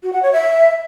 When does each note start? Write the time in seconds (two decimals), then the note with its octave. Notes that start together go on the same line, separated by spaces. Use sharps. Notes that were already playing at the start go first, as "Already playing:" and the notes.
0.03 F#4
0.13 F#5
0.23 C#5
0.32 E5